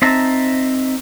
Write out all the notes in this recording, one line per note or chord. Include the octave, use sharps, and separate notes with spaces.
C4 D#4 E5 A5 A#5